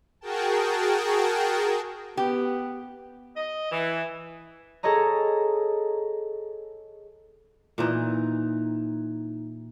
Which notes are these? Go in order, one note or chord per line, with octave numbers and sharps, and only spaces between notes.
F#4 G#4 A#4 G5 A5
B3 G4
D#5
E3
G#4 A4 C#5 D#5 A#5
A#2 E3 D#4